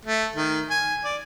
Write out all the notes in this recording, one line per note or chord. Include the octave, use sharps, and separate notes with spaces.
A3
D#3
G#5
D5